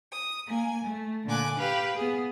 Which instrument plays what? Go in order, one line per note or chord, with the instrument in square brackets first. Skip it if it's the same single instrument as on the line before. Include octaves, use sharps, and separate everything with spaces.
[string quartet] D#6
A#3 G#5
A3
A#2 D3 G#5 D6 F#6
G4 B4 F5
B3 G#4